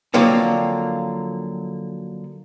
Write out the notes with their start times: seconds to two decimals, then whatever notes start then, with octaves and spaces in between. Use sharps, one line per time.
0.14 D3 F3 F#3 A#3 C4